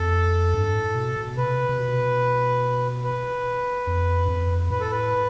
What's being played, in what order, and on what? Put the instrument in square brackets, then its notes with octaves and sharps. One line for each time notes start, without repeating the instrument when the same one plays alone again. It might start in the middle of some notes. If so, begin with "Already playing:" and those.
Already playing: [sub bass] F2 [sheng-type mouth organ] A4
[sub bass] G2
A2
B2
B2
[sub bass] C3 [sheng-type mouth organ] B4
[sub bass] C3
B2
[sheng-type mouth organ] B4
[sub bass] F2
G2
F2
[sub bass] A2 [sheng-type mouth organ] B4
[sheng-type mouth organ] A4
B4